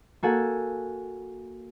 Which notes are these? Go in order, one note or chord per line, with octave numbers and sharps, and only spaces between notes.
A#3 F#4 A4 F#5 G#5